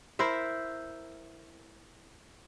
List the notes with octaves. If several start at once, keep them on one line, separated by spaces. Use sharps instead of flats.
E4 A#4 C5 E5